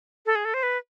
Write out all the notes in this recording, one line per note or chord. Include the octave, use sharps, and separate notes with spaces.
A4
G#4
A4
C5
B4